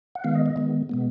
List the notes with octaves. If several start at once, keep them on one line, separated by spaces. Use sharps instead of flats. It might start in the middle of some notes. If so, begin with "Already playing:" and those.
F#5
D#3 G#3 B3 F5
D#5
D#5
D#3 G#3 B3
B2 G#3 B3